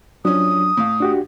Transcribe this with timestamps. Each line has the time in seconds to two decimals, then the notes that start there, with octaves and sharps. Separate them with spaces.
0.25 F3 F#3 C#4 D4 D#6
0.77 A2 F5
1.00 D4 F#4 G4